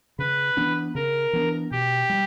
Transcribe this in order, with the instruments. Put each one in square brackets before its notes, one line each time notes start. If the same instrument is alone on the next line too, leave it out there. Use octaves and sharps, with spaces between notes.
[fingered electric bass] C#3 [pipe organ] B4
[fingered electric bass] E3 B3 D4
[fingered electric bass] C#3 [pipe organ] A#4
[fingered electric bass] E3 B3 D4
[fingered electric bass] B2 [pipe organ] G4
[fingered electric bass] G3